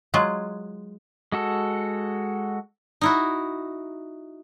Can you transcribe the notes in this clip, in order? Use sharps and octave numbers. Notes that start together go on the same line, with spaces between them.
F#3 G#3 F4
G#3 F#4 A4
D#4 E4 F#4